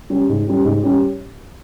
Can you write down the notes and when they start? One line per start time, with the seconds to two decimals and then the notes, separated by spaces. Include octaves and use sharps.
0.10 G3 C#4 G4
0.29 G#2
0.47 G3 C#4 G4
0.64 G#2
0.83 G3 C#4 G4